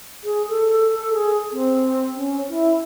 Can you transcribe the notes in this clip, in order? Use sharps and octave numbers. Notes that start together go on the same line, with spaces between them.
G#4
A4
A4
G#4
C4
C#4
E4